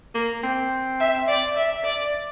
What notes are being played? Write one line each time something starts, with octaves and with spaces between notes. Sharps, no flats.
A#3
C4
E5
D5
E5
D5